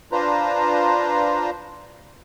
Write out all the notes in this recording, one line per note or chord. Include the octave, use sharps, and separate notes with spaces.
D4 F4 B4 C5 A#5